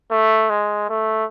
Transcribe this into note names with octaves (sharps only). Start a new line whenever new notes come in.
A3
G#3
A3